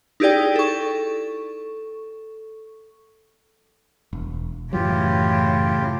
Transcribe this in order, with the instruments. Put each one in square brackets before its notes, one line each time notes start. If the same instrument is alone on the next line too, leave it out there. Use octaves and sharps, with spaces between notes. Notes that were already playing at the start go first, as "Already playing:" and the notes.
[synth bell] D#4 E4 G4 G#4 D5 G5
A4 C#6
[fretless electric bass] E1
[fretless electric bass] F#2 E3 F#3 [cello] A2 C#3 [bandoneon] F4 G4